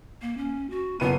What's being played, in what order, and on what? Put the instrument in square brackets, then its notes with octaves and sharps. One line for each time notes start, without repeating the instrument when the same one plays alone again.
[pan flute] A#3
C#4
F#4
[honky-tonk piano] F#1 B4 D#7 [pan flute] B3